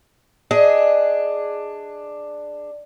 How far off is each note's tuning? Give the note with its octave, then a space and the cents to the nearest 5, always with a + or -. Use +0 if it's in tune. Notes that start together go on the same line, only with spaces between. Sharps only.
D4 +10 G#4 +0 D#5 +20